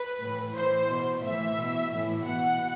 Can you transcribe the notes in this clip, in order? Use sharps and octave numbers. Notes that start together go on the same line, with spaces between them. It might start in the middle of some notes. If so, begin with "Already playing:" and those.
Already playing: B4
A2 E3
A2 E3 C5
B2
A2 E3 E5
B2
A2 E3
B2 F#5